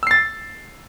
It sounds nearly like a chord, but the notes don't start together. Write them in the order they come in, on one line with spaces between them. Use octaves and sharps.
E6 C7 A6